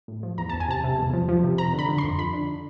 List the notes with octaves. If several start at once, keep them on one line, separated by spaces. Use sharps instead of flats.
A2
F3
E2 A#5
E2 A5
G#5
C3 A5
C3
E2
F3
F3
C3
F2 A#5
D3
B5
D3
C6
F2
F2 B5
D3